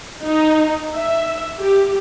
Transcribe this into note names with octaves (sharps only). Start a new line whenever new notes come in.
D#4
E5
G4